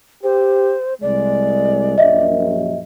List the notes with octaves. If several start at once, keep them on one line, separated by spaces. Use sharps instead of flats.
G4 C5
C2 G#3 D5
A#1 F#2 D#5 E5